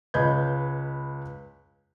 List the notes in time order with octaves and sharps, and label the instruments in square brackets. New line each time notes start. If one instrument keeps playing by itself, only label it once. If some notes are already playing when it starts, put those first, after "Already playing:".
[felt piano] C#2 B4 D#5 G6 G#6